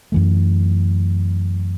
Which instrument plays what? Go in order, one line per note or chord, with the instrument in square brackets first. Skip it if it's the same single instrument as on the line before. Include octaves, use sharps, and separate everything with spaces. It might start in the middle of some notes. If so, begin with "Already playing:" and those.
[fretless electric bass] F#2 E3 A3